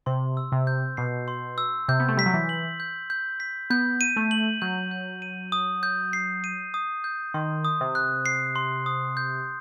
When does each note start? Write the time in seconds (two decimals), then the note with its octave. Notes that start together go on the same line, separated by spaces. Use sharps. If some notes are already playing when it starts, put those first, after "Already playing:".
0.06 C3 C6
0.37 E6
0.52 C3
0.67 G6
0.97 B2 C7
1.28 C6
1.58 E6
1.88 C3 G6
2.00 B3
2.08 A3
2.17 G3 B6
2.26 F#3
2.34 E3
2.49 F#7
2.80 G6
3.10 G6
3.40 B6
3.70 B3 G6
4.01 D#7
4.16 A3
4.31 F#7
4.62 F#3 G6
4.91 G6
5.22 D#7
5.52 D#6
5.83 G6
6.13 C7
6.44 D#7
6.74 D#6
7.04 G6
7.34 D#3 C6
7.65 D#6
7.81 C3
7.95 F#6
8.26 C7
8.56 C6
8.86 D#6
9.17 G6